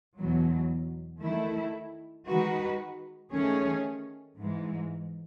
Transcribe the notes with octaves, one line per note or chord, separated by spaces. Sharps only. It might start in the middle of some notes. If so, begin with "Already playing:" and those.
E2 B2 F#3
D#3 A3 E4
D#3 G#3 D#4 F#4 B4
D#3 A3 C#4 G#4 C#5
G#2 E3 G#3